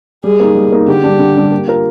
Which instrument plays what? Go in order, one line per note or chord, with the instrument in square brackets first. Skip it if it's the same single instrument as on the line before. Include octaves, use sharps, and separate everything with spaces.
[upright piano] G3 [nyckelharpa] G#4
[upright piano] A#3 D#4
G3
A#3 D#4
[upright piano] D3 [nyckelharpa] G4
[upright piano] G3 D4
D3
G3 D4
A#3
F4 A#4